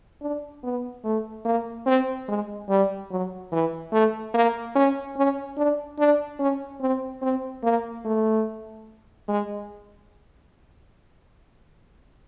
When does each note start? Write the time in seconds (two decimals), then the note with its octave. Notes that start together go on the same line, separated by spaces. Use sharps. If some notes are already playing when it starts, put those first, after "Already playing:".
0.21 D4
0.64 B3
1.04 A3
1.45 A#3
1.86 C4
2.28 G#3
2.69 G3
3.11 F#3
3.52 E3
3.92 A3
4.34 A#3
4.75 C#4
5.17 C#4
5.57 D4
5.99 D4
6.39 C#4
6.81 C4
7.22 C4
7.64 A#3
8.05 A3
9.28 G#3